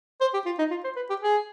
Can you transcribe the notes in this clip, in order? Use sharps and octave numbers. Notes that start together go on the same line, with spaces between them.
C5
G4
F4
D#4
F4
C5
B4
G4
G#4